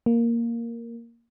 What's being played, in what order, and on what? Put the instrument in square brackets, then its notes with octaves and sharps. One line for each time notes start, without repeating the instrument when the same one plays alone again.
[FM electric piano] A#3